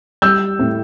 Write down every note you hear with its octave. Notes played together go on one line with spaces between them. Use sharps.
G3 E6 G6
A2